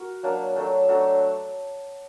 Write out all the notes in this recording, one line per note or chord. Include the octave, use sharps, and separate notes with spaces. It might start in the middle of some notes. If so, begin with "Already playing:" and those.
Already playing: F#4 A#4
F#3 A#3 D4
F#3 A3 D4
F#3 A3 D4